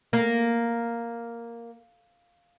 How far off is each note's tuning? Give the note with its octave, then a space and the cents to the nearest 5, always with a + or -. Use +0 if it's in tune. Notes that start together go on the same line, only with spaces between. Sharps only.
A#3 +0